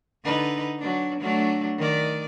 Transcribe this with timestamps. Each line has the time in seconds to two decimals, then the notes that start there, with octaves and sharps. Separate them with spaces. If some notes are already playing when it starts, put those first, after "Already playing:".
0.24 D3 D#4 B4
0.79 F#3 D4
1.20 F#3 A3 D4
1.78 D#3 D5